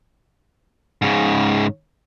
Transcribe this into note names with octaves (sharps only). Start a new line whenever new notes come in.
G#2 C#3